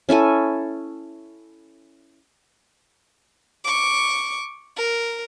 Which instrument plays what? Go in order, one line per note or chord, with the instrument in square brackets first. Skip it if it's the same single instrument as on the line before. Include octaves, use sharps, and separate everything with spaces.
[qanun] C#4 E4 A4 G#5
[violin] C#6 D6
A#4